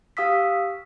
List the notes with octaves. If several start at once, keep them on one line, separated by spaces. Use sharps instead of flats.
G4 F5 D#6 E6 B6